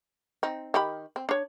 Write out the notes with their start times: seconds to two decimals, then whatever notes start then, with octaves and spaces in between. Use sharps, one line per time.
0.43 C4 D#4
0.74 D#3 G4 B5
1.16 C4
1.29 D4 C#5